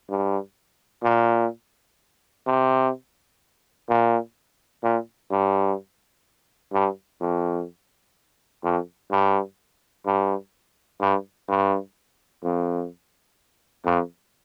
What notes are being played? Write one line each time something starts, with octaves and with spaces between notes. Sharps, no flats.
G2
A#2
C3
A#2
A#2
G2
G2
F2
F2
G2
G2
G2
G2
F2
F2